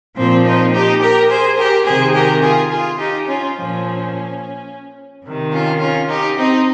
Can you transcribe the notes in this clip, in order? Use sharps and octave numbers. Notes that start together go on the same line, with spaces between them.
A#2 F3 C4
C4 D#4
D#4 G4
G4 A#4
G#4 C5
G4 A#4
C3 D#3 G#4 C5
G4 A#4
F4 G#4
F4 G#4
D#4 G4
C#4 F4
A#2 F3 C#4
C3 D#3
C#4 F4
C#4 F4
D#4 G4
C4 D#4